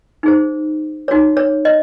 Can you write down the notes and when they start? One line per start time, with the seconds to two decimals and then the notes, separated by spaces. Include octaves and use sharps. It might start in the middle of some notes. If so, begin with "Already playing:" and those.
0.23 D#4 G#4 C5
1.08 D#4 F#4 C#5
1.37 C#5
1.65 D#5